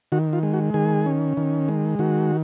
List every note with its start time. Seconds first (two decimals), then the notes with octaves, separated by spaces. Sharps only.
0.12 D#3 F#4
0.33 F4
0.43 G#3
0.53 F#4
0.74 D#3 G#4
1.06 C#4
1.37 D#3
1.69 G#3
1.99 D#3 F#4